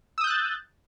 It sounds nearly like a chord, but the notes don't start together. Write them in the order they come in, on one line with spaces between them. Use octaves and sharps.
E6 D#6 G6 F#6 A6